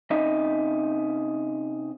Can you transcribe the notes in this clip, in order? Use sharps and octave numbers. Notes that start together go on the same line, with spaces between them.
C3 C#4 D#4 D#5 E5